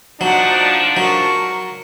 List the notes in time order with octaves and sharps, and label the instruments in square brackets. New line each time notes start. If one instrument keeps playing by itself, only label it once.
[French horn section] F3 D4 [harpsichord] F#3 [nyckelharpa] D#4 F#5
[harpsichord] F#3 [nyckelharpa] A#4 C#6